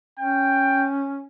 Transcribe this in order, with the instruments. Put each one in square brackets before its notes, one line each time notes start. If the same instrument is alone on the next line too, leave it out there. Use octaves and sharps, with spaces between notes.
[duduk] C#4 [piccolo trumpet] G5